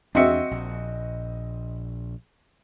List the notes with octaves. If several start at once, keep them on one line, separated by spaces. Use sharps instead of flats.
E2 C4 D4 F#4 D#5 E5 C#7
A#1